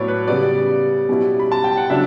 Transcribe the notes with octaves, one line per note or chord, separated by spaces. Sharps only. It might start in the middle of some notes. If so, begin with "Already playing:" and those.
Already playing: A2 F#3 B3 E4 C#5 D5
B4
C#3 G3 B3 D5
B2 G3 C#4 E4
B5
A5
G5
F#5
C#3 F#3 D4 E5